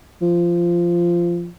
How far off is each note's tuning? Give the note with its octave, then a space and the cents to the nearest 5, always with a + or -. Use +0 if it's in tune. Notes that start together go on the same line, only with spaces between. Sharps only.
F3 -15